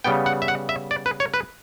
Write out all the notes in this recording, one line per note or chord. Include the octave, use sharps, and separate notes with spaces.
C#3 G3 B3 G5
F#5
E5
F#5
E5
D5
B4
C#5
B4